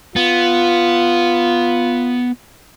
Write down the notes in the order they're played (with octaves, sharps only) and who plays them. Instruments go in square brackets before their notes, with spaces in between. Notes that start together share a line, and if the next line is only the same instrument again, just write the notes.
[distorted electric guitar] B3 [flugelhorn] F4